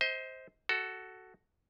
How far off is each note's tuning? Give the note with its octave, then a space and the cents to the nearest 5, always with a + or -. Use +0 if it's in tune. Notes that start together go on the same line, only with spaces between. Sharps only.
C5 +0 D#5 +35
F#4 +10 A4 +0